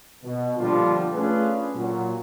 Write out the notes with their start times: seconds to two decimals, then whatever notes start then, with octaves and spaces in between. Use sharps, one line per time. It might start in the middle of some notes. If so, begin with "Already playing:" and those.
0.24 B2
0.58 A#2 D3 F3 G3 D4 F4
1.13 A3 C#4 D4 F4 G#4 B4
1.75 A#2 F#3